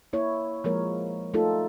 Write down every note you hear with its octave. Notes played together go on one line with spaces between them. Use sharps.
A#3 E4 C#5
F3 G#3 A#3 A#4 C#5
A3 D#4 F4 A4